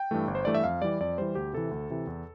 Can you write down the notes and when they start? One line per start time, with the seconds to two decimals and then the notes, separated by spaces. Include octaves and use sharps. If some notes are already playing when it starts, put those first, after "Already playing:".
Already playing: G5
0.11 G2 E3 A3
0.28 G1
0.35 C5
0.45 G2 E3 A3 D5
0.55 E5
0.64 F2 F5
0.82 E3 G3 D5
1.01 F2 D5
1.18 E3 G3 C5
1.35 D2 G4
1.53 C3 E3 A4
1.71 D2
1.90 C3 E3
2.07 E2